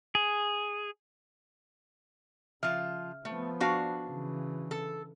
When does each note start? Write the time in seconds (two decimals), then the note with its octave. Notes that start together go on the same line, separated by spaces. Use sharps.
0.15 G#4
2.63 C#3 F3 F4 E5 F6
3.25 F3 A3 B3
3.60 D4 F#4 F5 A5 C#6
4.09 C#3 E3
4.71 A4